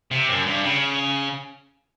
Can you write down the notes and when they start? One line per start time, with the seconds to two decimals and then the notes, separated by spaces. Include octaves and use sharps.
0.11 C3
0.29 F#2
0.46 G2
0.63 C#3